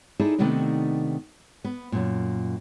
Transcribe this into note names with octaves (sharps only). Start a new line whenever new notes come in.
D#4 E4 G#4 A4 D5
C3 D#3 A3 B3 D4 D#4
B3
F#2 A#2